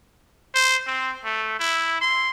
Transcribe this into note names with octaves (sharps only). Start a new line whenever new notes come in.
C5
C4
A3
E4
C6